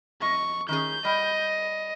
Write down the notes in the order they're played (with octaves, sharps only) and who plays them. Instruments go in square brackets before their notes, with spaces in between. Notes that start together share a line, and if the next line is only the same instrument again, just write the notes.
[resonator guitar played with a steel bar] F2 D#5 [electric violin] C#6
[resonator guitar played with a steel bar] D#3 C#4 G#4 [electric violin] G6
[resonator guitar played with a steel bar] G3 G5 [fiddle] D#5